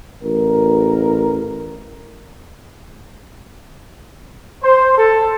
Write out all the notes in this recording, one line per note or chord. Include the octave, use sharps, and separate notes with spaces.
A1 A#4
C5
A4